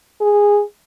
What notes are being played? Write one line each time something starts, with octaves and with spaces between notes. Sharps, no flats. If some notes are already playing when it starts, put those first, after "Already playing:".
G#4